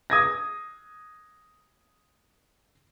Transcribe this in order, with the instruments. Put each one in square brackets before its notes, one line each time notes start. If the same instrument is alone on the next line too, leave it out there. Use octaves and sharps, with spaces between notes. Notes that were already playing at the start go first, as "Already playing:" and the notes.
[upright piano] D#6 G#6 A#6